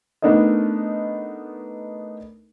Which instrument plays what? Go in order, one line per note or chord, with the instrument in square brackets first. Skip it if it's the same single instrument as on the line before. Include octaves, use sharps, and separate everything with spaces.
[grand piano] A3 B3 D4 D#4 A#4 D#5